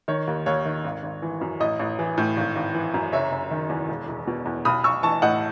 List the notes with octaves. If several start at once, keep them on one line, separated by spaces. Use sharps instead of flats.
D#3 C#5
D#2
D#2 C#5
D#3
G#1
G#1
E3
F#2
A1 D#5
A1
E3
A2
G#1
G#1
E3
F#2
F#1 C#5 E5
F#1
D#3
E2
E1
E1
B2
E2
B1 B5 D#6
B1 C#6 E6
E3 A5 C#6
A2 D#5 F#5